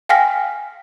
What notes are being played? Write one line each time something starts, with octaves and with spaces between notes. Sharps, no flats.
F5 G5 G#5 F6 A#6 B6